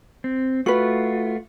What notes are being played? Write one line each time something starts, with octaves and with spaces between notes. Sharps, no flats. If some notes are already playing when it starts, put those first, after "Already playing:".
C4
A3 F4 F#4 B4